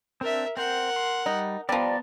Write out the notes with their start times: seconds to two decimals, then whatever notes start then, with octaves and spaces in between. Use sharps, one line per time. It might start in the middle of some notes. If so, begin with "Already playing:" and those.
0.21 C4 D4 A#4 E5
0.57 C4 A#4 C5 F#5
0.96 C6
1.26 G3 D#4
1.69 F3 G3 B3 D5 A5 A#5